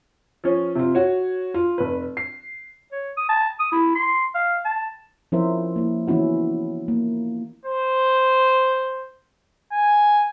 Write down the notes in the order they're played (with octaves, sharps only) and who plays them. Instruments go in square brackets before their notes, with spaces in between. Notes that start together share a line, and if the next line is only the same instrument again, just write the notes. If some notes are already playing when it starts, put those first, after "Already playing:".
[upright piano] F3 C#4
C3 F4
F#4 C#5
F4
F1 B4
C7
[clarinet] C#5
D#6
A5
D#6
E4
C6
F5
A5
[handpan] F3 C#4 E4 A#4 C5 E5
A#3 E4
E3 B3 C#4 E4 F#4
A#3
[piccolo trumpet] C5
G#5